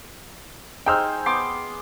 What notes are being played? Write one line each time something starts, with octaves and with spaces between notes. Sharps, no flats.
D#4 G#4 C5 G5 E6 F6
B3 C6 D6